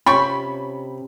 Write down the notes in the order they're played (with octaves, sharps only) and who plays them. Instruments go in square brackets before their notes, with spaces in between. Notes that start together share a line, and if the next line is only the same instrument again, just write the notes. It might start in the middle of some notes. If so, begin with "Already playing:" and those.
[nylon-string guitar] C3 C#4 [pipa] F4 G5 C#6 [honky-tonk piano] B5